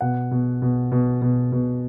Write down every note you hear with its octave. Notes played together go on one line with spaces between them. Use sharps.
B2 F#5
B2
B2
B2
B2
B2